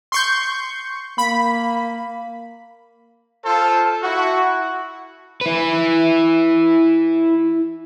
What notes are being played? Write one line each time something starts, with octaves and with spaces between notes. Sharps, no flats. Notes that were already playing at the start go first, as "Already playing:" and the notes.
C6 C#6 G6
A#3 B5
F4 A4 C5
E4 F#4
E4 B4